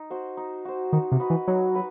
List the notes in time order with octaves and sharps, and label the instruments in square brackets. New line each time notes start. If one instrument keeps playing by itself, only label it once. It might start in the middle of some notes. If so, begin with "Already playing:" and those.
Already playing: [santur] D#4
F#4 C5
D#4
F#4 C5
[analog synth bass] D#3 [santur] D#4
[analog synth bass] C3
[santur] F#4 B4 D#5
[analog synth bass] E3
[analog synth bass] F#3 [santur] D#4
[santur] F#4 B4